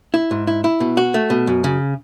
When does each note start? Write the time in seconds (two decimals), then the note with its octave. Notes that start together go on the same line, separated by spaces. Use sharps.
0.14 E4
0.31 G#2
0.47 E4
0.64 E4
0.80 B2
0.97 F#4
1.14 A3
1.30 B2
1.47 F#2
1.64 C#3